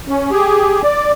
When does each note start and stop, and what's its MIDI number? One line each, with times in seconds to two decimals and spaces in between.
0.08 0.31 61
0.31 0.82 67
0.31 0.82 68
0.84 1.12 74